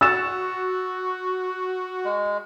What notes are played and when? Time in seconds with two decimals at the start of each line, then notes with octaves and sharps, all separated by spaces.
0.01 F#4 E6 A6 E7
2.05 G#3